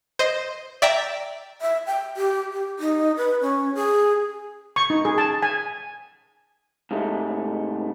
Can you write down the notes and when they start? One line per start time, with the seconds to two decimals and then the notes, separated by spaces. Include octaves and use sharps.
0.19 C5 D#5
0.82 D5 E5 G5 A#5
1.62 E5
1.87 G5
2.17 G4
2.53 G4
2.79 D#4
3.17 B4
3.41 C#4
3.75 G#4
4.76 C#6
4.90 D#4
5.05 G#4
5.18 A5
5.43 G#5
6.91 G#2 C3 G#3 A3